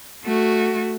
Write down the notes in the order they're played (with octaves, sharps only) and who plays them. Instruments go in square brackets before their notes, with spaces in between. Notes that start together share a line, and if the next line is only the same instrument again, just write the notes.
[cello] A3 F#4